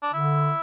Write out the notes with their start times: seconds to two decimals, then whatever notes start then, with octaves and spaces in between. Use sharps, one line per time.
0.02 D4
0.13 D3 E4